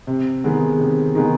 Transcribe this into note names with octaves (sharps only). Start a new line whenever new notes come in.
C3
D#3 G#3 B3
C3
D#3 G#3 B3